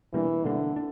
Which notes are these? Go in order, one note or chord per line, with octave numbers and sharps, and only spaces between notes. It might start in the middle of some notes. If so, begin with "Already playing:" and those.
B2 E3 G3 A#3 D4
B2 D3 G3 A#3 D4
D4